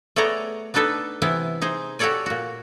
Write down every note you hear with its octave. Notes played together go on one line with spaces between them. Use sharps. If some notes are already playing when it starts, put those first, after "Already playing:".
A3 B3 G#4 C#5 D5 A#5
B3 D4 D#4 A4 B4
C3 E3 B3 E4
D#4 G#4 C5
F#4 G4 A4 C#5 D5 G#5
A#2 F#4